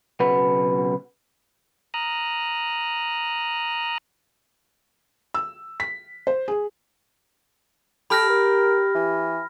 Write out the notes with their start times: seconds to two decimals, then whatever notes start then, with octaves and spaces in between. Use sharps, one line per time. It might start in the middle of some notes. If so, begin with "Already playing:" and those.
0.20 B1 C#3 F#4 B4 F#5
1.94 A#5 D#6 F6 F#6
5.34 E6
5.80 B6
6.27 C5
6.48 G#4
8.10 G4 A4 B5 F6 A#6
8.29 A#4
8.95 E3